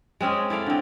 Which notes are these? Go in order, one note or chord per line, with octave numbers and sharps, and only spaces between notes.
G#3 C4 C#4 G#4
E4 A4 D5 F5
D3 C4